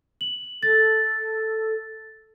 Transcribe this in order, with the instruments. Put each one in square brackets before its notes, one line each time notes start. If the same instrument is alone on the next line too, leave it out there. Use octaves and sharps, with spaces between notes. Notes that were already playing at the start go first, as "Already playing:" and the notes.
[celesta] F#7
[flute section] A4 [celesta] A6